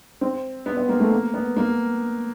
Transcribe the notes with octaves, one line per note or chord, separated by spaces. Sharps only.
C4
B3
B3
A#3
A3
A#3
B3
A#3